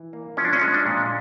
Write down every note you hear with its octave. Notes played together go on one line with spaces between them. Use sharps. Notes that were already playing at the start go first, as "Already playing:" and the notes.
Already playing: E3
A#3
F3 C#4
D4
C#4
G#3
D4
A#2